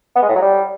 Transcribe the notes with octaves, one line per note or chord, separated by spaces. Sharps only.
B3
G#3
A2
F#3
G3